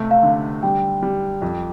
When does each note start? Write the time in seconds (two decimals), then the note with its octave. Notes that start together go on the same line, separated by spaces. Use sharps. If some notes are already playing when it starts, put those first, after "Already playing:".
Already playing: C#2 C3 A3
0.11 F5
0.23 D3
0.63 G3 G5
1.03 G3
1.42 F2